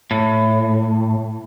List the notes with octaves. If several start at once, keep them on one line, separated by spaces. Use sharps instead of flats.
A2